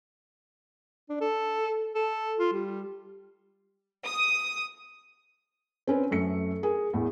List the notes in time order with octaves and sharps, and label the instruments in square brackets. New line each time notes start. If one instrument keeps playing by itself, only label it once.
[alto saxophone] D4
A4
A4
F4
G3
[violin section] D#6
[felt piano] C4 C#4 B4
F#2 A3 C#7
G#4 A#4
E2 A2